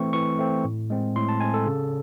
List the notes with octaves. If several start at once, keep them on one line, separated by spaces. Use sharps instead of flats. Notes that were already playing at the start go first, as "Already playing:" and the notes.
Already playing: E3 A3 C4 C#6
E3 C#6
A3 C4
A2
G#3 C4
A2 C6
A5
G#3 C4 G#5
A4
C#3